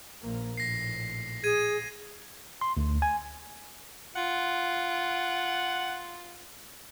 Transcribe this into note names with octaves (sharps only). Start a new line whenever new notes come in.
A#1 A#3
A#1 A2 A#6 C7
G#4 G#6 D#7
C6
D2
G#5
F4 F#5